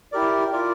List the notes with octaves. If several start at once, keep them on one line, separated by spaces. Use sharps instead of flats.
E4 G4 A#4 D5
F4 A#4 D5